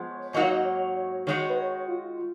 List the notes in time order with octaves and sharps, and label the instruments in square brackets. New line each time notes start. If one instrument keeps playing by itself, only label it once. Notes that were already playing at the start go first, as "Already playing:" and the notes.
Already playing: [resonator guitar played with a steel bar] F3 G#3 B3
[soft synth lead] C#5
[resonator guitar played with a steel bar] G#2 F#3 A#3 D#4 F#4 [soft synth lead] D#5
[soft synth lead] C#5
D#5
C#5
C#5
[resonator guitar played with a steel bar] D#3 G#3 D#4 F#4 [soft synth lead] C#5
[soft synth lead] B4
C#5
F4